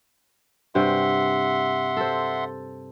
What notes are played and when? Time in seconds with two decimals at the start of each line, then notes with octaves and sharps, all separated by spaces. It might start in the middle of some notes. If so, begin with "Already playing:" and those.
0.75 G2 C3 E5 F#5 G5 C6
1.97 A4 C5